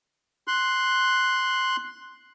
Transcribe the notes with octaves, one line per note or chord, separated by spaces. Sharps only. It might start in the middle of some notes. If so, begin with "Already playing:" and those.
C6 F#6